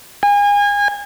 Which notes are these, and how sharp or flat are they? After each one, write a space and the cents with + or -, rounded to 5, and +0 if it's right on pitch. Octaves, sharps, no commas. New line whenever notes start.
G#5 -30